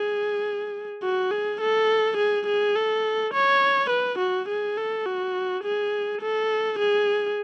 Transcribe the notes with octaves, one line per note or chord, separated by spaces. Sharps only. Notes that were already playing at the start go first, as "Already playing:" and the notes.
Already playing: G#4
F#4
G#4
A4
G#4
G#4
A4
C#5
B4
F#4
G#4
A4
F#4
G#4
A4
G#4